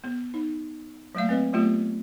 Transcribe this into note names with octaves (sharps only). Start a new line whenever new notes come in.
B3
D#4
F#3 A3 A#3 F5
C4 B4 D#5
F#3 A3 B3 F4 G4